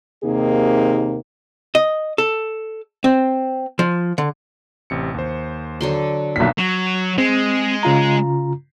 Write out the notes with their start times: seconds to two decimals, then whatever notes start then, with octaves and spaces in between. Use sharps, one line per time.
0.24 D#2 C3 A#3 D#4 G#4
1.75 D#5
2.18 A4
3.04 C4
3.79 F3
4.18 D3
4.90 A1 C3 C#7
5.14 D#2 C5
5.81 D3 F#3 C6
6.36 B1 D#3 A#3 B6
6.58 F#3
7.18 G#3 C4
7.83 C#3 F4 A#5